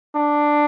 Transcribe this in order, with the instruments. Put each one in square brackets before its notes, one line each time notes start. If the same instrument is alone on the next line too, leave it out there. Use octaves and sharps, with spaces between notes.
[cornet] D4